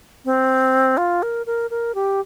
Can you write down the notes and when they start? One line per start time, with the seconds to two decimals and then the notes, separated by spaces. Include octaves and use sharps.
0.25 C4
0.97 F4
1.23 A#4
1.46 A#4
1.70 A#4
1.95 G4